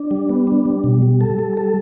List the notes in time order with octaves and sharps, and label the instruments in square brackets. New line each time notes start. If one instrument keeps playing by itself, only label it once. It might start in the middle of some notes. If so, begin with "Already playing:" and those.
Already playing: [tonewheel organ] D4
G3
B3
D4
G3
B2
G3
A4
G3
A4